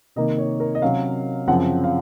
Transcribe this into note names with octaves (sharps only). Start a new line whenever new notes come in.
C3 D#3 A#3 D#5
C#5
A#4
D#5
C3 F#3 C#4 F5
F#2 C#3 F3 C4 F#5
F5